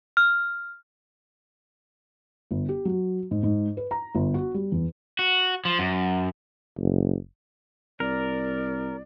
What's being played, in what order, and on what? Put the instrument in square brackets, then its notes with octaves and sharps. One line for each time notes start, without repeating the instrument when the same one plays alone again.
[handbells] F6
[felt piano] G1
G4
F#3
G#2
G#2
B4
A#5
G1
F#4
G3
E2
[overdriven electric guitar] F#4
F3
F#2
[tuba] F#1
[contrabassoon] C2 [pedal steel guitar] A#4 [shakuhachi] D5